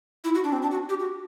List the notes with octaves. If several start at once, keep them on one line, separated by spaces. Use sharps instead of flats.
E4
F#4
D4
C4
D4
F#4
G4
F#4